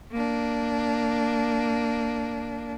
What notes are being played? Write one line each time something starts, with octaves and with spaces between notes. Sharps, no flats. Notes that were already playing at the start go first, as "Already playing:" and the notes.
A#3 D4